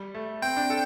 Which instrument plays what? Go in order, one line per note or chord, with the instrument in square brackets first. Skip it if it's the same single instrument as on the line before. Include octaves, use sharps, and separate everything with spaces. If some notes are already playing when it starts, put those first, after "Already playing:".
Already playing: [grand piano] G3
A3
[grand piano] C4 [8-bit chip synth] G5
[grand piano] D4
A4